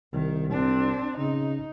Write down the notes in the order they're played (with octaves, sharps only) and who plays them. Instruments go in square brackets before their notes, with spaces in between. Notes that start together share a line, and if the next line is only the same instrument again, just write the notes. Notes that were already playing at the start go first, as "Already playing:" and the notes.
[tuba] C2 [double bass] D#3
[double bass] C4 D4
[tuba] C#3 [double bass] D#4